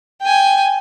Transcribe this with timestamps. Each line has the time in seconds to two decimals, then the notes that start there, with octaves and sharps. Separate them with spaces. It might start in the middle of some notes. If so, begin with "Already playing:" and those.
0.22 G5 G#5